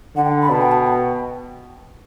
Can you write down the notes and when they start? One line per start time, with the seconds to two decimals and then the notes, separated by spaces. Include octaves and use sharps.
0.16 D3 F#5
0.25 G5
0.42 B5
0.50 B2 A5
0.61 G5
0.71 A5
0.85 G5